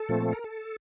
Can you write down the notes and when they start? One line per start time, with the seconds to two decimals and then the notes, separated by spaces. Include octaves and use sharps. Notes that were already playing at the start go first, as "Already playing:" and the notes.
Already playing: A4
0.09 A#2 F3 A3 C4
0.33 A#4
0.44 A4